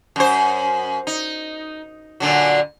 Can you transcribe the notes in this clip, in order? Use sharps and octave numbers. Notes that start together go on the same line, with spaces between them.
F#2 C5
D#4
A#2 D3 F#3